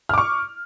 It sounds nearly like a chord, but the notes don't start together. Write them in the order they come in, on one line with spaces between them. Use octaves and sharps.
F6 D6 C#6